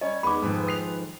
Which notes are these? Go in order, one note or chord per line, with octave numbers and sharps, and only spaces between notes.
G3 C#4 C#5 D#5
E2 D#3 G#3 B3 G#4 B5 D6
F2 G#2 D#3 F3 G#4 A4 B4
D#6 C7 F7